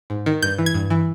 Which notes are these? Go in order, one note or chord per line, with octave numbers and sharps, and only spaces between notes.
G#2
D#3
G2 G6
E3
G#6
G2
E3